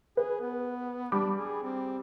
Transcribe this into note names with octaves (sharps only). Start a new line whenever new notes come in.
G#4 B4
B3
G3 D4 B5 D6
G#4
C4